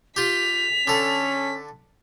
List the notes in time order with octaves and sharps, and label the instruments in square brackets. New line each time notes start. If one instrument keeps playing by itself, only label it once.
[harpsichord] F4 G4 [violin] B6 [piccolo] F7
[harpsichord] D3 A4 [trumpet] C#4